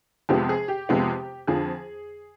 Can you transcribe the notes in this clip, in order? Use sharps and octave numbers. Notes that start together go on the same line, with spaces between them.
F2 C3 F3 G#3 B3 G4
G#4
G4
F2 C3 F3 G#3 B3
F2 D3 F3 G#4